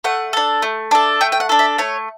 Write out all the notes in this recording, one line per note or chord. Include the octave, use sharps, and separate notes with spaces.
A3 F#5
D4 A4
A3
D4 A4
A3 G5
G5
F#5
D4 A4
E5
A3 C#5